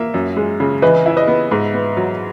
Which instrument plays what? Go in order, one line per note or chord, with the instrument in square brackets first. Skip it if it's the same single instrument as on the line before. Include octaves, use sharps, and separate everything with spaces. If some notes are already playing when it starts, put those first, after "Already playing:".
Already playing: [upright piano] A#3 [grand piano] E5
[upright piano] F#2
G#3
C#3
[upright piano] E3 [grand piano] B4 D#5
[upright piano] E4 [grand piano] E5
[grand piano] B4 D#5
[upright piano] B3
G#2
B3
F#3